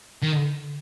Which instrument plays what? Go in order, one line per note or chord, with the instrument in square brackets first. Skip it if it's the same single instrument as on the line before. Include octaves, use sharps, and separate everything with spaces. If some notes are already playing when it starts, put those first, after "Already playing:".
[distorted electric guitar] D#3